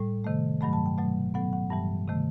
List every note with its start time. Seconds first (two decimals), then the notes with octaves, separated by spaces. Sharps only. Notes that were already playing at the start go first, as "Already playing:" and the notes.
Already playing: A2 G3
0.24 C3 D#3 A3
0.61 G2 D#3 F#3 A3 B5
0.73 A5
0.86 G5
0.98 B2 F#3 A3
1.34 A2 F#3 B3 F#5
1.53 F#5
1.70 G2 E3 G3 A5
2.07 C3 D#3 A3